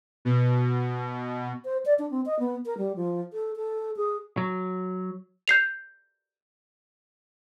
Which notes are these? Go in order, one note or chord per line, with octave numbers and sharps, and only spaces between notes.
B2
C5
D5
D4
C4
D#5
B3
A#4
G3
F3
A4
A4
G#4
F#3
G6 C7 F7